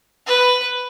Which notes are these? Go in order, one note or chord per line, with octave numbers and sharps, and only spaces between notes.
B4